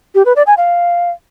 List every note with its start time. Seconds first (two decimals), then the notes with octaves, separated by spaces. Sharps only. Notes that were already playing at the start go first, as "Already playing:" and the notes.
0.15 G4
0.25 B4
0.36 D5
0.47 G#5
0.57 F5